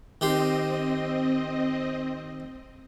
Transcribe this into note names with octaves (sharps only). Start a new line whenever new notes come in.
D#3 C4 G4 D#5 C6